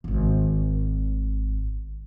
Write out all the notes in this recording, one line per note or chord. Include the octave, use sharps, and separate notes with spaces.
D1 G#1